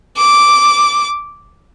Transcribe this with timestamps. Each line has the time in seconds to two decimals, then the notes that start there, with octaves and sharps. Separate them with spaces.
0.17 D6